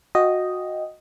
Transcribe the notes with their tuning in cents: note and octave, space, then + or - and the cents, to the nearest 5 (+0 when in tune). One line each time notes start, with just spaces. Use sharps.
F#4 -20 D#5 +0 G5 +0